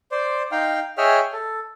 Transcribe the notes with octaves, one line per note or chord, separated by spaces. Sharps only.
C5 D5
D#4 F5 G5
G#4 C#5 D#5 E5 G5 F6
A4